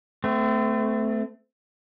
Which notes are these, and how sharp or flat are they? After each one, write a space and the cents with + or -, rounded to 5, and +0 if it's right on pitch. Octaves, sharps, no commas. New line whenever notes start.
A3 +0 C4 -35